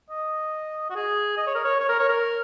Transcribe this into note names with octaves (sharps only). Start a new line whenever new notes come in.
D#5
F#4
G#4
D#5
C#5
A#4
C#5
C#5
A#4
C#5
A#4